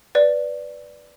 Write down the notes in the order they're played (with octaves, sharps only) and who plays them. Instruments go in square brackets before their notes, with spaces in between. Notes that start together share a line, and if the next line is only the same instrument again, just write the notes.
[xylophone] B4 D5